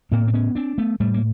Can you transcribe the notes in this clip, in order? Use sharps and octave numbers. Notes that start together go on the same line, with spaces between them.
A2 A#3 C4
C4
B3 C#4
C4 D4
A3 B3
A2 G3 A3
A#3